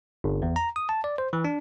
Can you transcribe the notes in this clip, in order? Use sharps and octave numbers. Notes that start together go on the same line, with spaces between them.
G1
E2
A#5
D#6
A5
D5
C5
E3
D4